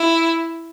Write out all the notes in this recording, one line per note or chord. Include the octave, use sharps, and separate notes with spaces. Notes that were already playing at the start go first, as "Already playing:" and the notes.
Already playing: E4